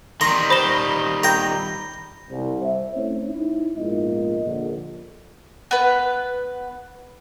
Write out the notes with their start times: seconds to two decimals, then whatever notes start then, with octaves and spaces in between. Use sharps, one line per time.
0.21 D#3 G3 A#5 C6
0.50 C5 B5 A#6 E7 G7
1.23 G5 A#5
2.31 C2
2.62 C5 E5
2.96 A3 C4 C#4 E4 C5 C#5
3.28 D#4 E4
3.77 A#1 G#2 B3 F4 A#4 D#5
4.45 A#1 D3
5.71 B3 B4